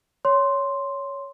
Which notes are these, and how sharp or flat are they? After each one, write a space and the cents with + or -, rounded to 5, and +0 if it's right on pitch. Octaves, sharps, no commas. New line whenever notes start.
C#5 +10 C6 +0